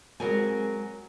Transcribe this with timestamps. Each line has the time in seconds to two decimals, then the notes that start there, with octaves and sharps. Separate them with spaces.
0.20 F#3 G#3 C4 A#4 G#5